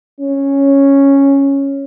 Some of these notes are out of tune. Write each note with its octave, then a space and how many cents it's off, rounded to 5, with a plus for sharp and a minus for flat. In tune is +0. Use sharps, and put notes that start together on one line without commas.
C#4 -5